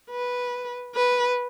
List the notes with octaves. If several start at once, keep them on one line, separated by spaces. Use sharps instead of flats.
B4
B4